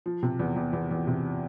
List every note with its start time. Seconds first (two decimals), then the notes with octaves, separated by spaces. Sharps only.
0.06 F3
0.23 C3
0.40 E2
0.56 E2
0.73 E2
0.91 E2
1.07 C3